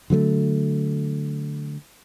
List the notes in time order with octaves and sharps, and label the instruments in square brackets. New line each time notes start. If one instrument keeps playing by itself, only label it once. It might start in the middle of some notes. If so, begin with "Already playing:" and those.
[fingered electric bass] D3 F#3 G#3 A3